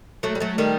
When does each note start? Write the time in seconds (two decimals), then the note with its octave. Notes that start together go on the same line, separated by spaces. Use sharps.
0.23 F#3 A3
0.35 G3
0.40 F#3 A3
0.58 D#3 G3